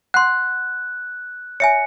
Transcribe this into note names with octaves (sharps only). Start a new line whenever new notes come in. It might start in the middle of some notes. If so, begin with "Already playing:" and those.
F#5 C6 F#6
C#5 E5 G#5 C#7